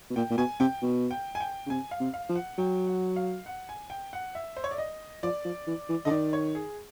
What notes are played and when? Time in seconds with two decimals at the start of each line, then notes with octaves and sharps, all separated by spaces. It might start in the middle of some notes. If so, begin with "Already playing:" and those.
0.10 B2
0.16 A#2 G5
0.30 A#2
0.37 B2 G#5
0.60 C3 G5
0.82 B2
1.11 G5
1.35 G#5
1.40 G5
1.66 C#3
1.70 C3 G#5
1.91 F5
2.00 C3
2.14 F5
2.29 F3
2.35 F#5
2.58 F#3 G5
2.87 F#5
3.16 F5
3.46 F#5
3.69 G#5
3.90 G5
4.13 F#5
4.35 E5
4.57 C5
4.64 C#5
4.71 D5
4.78 D#5
5.23 F3 D5
5.45 F3
5.67 E3
5.89 E3
6.05 D3 D#5
6.10 D#3 D5
6.33 C#5
6.55 G#4